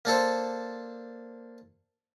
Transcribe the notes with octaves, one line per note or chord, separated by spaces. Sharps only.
A#3 D4 A4 C5